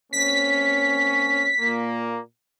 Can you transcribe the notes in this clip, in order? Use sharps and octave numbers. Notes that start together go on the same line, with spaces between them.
A#3 C4 C#4 B6
A#2 A#3